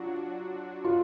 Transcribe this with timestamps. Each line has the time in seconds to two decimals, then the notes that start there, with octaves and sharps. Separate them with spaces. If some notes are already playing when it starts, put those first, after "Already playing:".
Already playing: F#3 D4 F4 F#4
0.84 F4